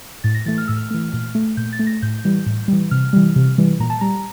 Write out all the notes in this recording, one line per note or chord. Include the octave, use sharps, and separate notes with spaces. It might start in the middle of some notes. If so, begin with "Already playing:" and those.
A2 A6
A#6
E3 A3 A6
F6
A2 E6
F6
E3 A3
A#2
A3
A#2 G6
A6
A3
A#6
A2 G6
E3 G3
A2
E3 G3
C3 F6
E3 G3
C3
E3 G3
A#2 A#5
A5
G3 A#5